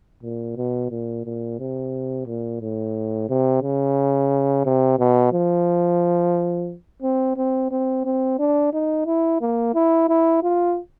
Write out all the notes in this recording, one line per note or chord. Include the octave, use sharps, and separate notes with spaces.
A#2
B2
A#2
A#2
C3
A#2
A2
C3
C#3
C3
B2
F3
C4
C4
C4
C4
D4
D#4
E4
A#3
E4
E4
F4